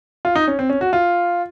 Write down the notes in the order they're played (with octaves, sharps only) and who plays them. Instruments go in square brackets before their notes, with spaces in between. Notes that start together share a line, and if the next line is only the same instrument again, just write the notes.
[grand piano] F4
D#4
C#4
C4
C#4
F#4
F4